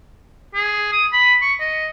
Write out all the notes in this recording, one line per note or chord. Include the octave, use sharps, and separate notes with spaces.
G#4
D#6
B5
C#6
D#5